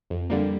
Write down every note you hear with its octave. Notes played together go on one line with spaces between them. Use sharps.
F2
D3 G3 A#3